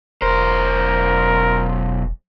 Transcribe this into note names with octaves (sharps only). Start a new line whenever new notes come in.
E1 B1 A#4 C5